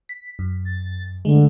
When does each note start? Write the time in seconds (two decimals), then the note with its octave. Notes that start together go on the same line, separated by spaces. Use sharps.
0.09 B6
0.39 F#2
0.65 A6
1.25 D3 G#3 A3